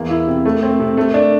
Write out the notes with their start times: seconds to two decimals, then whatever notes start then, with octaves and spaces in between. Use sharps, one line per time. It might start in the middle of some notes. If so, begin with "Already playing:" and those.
Already playing: E2 A#3
0.10 E4
0.27 C3
0.45 A3
0.63 C4
0.80 C3
0.97 A3
1.14 D4